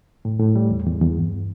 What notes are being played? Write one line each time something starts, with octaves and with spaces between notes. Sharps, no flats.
A2
A2
G3
E2
E2
E2
G2